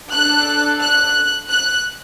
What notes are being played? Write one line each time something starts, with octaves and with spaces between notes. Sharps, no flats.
D4 A4 F#6
F#6
F#6